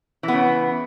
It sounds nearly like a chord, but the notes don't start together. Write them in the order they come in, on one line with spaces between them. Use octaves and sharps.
E3 B3 C#3